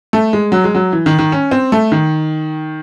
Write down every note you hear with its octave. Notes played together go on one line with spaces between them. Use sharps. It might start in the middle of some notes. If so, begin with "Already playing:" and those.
A3
G#3
F#3
G#3
F#3
E3
D#3
D#3
C#4
C4
A3
D#3